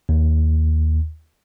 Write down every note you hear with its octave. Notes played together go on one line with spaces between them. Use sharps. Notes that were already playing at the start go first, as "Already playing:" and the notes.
D#2